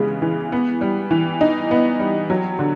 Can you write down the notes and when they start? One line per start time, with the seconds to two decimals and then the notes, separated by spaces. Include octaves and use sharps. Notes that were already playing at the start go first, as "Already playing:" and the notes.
Already playing: C#3 E3 G#3 B3
0.22 E3
0.52 B3
0.81 G3
1.11 E3
1.41 D#4
1.71 B3
1.99 G3
2.30 F#3
2.59 D3